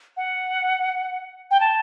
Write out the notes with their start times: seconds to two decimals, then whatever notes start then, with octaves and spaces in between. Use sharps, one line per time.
0.17 F#5
1.51 G5
1.60 A5